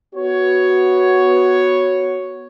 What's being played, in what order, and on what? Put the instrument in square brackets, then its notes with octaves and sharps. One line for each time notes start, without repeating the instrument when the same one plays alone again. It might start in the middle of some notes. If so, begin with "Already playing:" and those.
[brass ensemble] B3 F#4 C#5